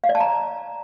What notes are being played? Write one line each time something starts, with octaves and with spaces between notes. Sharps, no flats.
F5
D5
A5
A#5